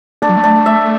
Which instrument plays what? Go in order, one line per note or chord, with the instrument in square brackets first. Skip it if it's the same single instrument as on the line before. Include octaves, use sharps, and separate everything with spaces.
[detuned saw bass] A3 [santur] D4
[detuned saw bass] F#3
A3
[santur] D4
E5